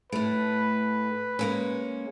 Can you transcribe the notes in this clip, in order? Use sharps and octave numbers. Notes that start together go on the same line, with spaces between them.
A2 A3 B4
G#3 A#3 C#4